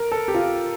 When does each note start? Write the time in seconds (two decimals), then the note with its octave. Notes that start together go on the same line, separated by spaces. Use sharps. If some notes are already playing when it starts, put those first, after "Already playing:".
Already playing: A#4
0.12 A4
0.28 G4
0.35 F4